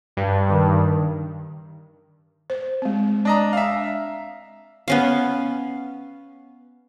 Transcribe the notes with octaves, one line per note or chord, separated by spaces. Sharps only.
G2
D#3
C5
G#3 C4
D4 D#5 A#5
E5 F5
B3 C#4 F5